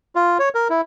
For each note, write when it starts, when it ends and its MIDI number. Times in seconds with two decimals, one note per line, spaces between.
0.15 0.38 65
0.39 0.49 73
0.55 0.68 70
0.70 0.81 64